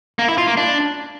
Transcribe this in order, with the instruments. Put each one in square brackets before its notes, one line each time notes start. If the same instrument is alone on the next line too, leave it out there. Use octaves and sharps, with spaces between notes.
[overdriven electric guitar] A#3
E4
F4
A#3
D4